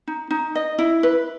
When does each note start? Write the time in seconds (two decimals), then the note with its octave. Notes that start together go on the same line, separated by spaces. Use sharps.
0.07 D#4
0.31 D#4
0.55 D#5
0.79 E4
1.03 B4